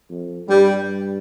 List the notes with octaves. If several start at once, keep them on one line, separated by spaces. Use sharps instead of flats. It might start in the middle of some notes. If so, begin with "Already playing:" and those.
F2
G2 G3